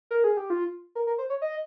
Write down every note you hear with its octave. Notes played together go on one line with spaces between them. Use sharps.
A#4
G#4
G4
F4
A#4
A#4
C5
C#5
D#5